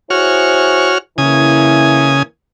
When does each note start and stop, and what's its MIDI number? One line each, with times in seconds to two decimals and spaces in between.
0.10 0.92 64
0.10 0.98 66
0.10 0.92 68
0.10 0.92 72
0.10 0.98 73
0.10 0.98 89
1.18 2.23 49
1.18 2.22 52
1.18 2.22 58
1.18 2.22 64
1.18 2.23 80
1.18 2.23 87